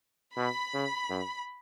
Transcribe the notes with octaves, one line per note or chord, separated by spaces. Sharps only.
B2 B5
C#3
F#2